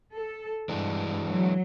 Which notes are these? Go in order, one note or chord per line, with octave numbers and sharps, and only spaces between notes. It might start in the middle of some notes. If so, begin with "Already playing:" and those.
A4
G2 E3 G#3 D4
F#3